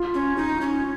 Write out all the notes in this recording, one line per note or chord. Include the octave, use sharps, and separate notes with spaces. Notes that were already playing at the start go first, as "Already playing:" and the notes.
Already playing: F4
C#4
D#4 F4
C#4